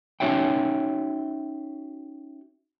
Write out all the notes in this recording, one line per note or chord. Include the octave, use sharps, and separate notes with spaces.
C#4 D#4 F#4 C#5 E5 G5